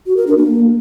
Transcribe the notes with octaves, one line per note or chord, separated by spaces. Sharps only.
F#4
A#4
D4
A#3